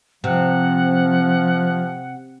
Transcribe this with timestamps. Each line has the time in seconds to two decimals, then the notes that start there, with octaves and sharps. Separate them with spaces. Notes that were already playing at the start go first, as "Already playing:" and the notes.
0.24 C3 F3 F#5